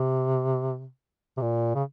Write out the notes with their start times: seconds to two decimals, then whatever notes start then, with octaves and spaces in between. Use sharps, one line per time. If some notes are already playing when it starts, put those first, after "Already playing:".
Already playing: C3
1.37 C3
1.42 A#2
1.75 C#3